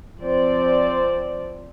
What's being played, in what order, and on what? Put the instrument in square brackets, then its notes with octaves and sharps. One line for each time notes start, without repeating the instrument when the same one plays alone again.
[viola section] F3 C4 C5 D5